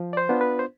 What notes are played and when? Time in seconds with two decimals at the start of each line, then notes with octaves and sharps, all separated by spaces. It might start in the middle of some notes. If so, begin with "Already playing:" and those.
Already playing: F3
0.13 D5
0.17 C5
0.29 B3 D4 F4
0.41 B4
0.59 C5